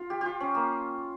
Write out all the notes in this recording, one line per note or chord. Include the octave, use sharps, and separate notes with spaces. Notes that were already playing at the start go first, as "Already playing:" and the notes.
Already playing: F4
G4
F4 G4
C#4
A#3